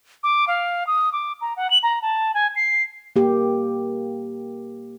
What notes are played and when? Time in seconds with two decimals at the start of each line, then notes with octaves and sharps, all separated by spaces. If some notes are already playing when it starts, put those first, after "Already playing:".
0.23 D6
0.48 F5
0.87 D#6
1.13 D6
1.41 A#5
1.57 F#5
1.70 F#7
1.83 A#5
2.02 A5
2.34 G#5
2.56 C7
3.16 A#3 G4